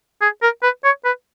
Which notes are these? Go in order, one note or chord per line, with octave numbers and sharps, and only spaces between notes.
G#4
A#4
B4
C#5
B4